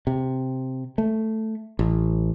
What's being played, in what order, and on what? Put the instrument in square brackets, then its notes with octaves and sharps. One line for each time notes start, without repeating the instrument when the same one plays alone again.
[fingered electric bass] C3
A3
A1